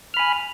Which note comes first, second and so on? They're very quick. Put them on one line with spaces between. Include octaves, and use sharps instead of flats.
F6 B5 G#5